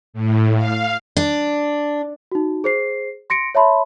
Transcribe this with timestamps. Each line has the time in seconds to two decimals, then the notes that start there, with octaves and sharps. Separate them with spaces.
0.14 A2
0.56 F5
1.17 D4
2.32 D#4 F#4
2.64 G#4 C5 C7
3.30 C6 A#6 C#7 D7
3.55 C#5 E5 A5 B5 C6